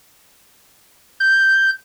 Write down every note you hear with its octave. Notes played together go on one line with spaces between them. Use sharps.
G6